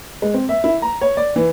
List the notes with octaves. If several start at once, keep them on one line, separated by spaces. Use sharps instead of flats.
G#3
C4
E5
E4
A#5
C#5
D5
E3